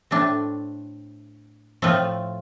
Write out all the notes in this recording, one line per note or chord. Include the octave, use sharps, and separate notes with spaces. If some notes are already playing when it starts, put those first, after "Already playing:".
A2 A3 C4 D4
A2 F3 A3 C4